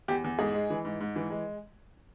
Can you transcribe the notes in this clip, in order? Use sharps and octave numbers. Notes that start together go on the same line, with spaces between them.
E2 G4
E2
G#2 G#4
G#3
E3
G#2
G#2
E3
G#3